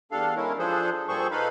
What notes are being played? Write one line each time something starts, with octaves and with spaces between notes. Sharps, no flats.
E2 G3 D4 A4 F5
G#3 C#4 E4 A#4
F3 D4 G#4 A4 C5
A#2 G3 G#4 A4 C5 C#6
D#4 A4 B4 F5 B5